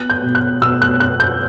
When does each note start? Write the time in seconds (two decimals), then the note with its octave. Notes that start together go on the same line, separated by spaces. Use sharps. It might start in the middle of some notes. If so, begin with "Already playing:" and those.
Already playing: B3 F#6
0.10 G6
0.23 B2
0.35 F#6
0.61 B2 E6
0.82 F#6
1.00 B3 F#6
1.20 G6